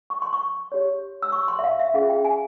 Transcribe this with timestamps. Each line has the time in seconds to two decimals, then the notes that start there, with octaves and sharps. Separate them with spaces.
0.10 C#6
0.22 C6
0.33 C#6
0.72 G4 C#5
1.23 E6
1.32 C#6
1.48 C6
1.59 E5
1.64 F5
1.79 E5
1.94 C#4 F4 G#4 F5
2.10 G5
2.25 G#5